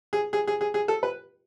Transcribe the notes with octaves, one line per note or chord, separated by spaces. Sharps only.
G#4
G#4
G#4
G#4
G#4
A4
B4